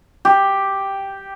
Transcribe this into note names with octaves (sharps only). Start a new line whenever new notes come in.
G4